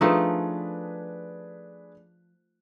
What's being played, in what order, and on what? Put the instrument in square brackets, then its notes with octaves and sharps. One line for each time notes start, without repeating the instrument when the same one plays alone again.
[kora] F3 A3 D#4 [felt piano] D4 G#4 B4